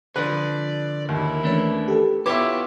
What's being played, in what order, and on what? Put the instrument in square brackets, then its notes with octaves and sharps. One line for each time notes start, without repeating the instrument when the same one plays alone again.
[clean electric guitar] D3 F3 [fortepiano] B4 [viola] D5
[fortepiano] D#2 [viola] E4 A#4
[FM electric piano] E3 C#4 B4 [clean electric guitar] A3 D4
[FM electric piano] G4 A4
[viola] B3 F4 [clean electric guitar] E4 G4 C#5 [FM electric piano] B4 [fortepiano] E5 D6